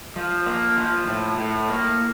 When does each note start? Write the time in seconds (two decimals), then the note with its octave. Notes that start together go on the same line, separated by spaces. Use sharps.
0.16 F3
0.46 A#3
0.77 F3
1.07 A2
1.38 A2
1.69 A#3